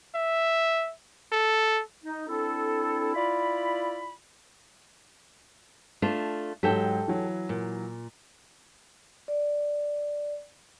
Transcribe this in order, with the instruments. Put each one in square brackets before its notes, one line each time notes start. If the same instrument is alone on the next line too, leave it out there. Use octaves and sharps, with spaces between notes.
[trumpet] E5
A4
[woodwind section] D#4
C4 D4 E4 A4
E4 F4 D5 B5
[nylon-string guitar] A3 D4 F4
[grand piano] G#2 F#3 [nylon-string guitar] G4 A4 G5
[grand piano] E3 F#3
[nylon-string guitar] A#2
[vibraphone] D5